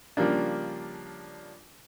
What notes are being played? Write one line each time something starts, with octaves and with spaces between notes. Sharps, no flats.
C#3 F3 G3 A#3 D4